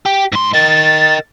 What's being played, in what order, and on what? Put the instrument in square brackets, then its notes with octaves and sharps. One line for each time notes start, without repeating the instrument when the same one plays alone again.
[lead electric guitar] G4
G#2 C6
[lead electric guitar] A#4 D#5 [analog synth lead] A6